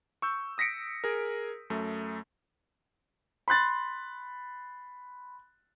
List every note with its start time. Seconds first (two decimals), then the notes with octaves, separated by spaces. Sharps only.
0.22 C#6 E6 G6
0.58 D#6 A#6 B6 C#7 D7
1.04 G#4 A#4
1.70 F#2 A3
3.48 B5 C6 F#6 A6